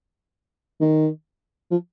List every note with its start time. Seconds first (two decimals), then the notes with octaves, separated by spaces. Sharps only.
0.81 D#3
1.71 F3